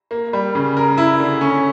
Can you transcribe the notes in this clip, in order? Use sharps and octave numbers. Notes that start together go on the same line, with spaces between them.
A#3
G3
C#3
A#4
E4
D3
C#4